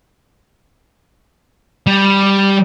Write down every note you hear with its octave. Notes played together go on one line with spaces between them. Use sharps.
G3